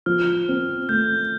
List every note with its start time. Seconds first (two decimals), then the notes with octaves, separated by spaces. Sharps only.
0.06 F3 F6
0.49 C4
0.89 A3 G6